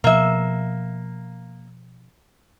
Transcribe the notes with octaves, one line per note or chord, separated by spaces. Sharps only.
B2 F3 A#3 E5